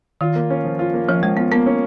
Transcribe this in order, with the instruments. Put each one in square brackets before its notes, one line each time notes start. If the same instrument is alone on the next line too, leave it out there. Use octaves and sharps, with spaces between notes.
[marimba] D#3 [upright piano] F4
[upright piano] A#3
C#4
F3
F4
A#3
[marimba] F3 [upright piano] C#4
[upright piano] F3 [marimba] G#3
[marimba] B3 [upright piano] F4
[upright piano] A#3 [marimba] B3
[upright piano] C#4